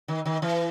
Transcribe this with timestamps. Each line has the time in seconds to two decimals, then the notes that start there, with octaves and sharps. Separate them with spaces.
0.08 D#3
0.25 D#3
0.42 E3